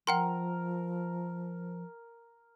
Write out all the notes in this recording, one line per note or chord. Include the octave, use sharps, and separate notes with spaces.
F3 A#4 F#5 G5 C6